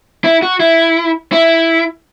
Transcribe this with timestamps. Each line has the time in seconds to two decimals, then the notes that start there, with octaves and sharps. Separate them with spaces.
0.24 E4
0.42 F#4
0.60 E4
1.32 E4